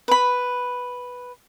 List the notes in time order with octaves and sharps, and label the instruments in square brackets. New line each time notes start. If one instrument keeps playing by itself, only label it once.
[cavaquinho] B4 B5